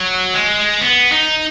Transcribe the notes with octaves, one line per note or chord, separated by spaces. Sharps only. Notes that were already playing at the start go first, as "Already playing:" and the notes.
Already playing: F#3
G#3
B3
D#4